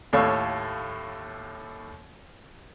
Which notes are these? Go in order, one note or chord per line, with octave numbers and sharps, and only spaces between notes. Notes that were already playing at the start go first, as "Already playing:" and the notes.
D#2 A2 A3 A4 C#5 F5